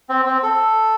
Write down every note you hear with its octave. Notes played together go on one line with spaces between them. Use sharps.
C4
C4
A4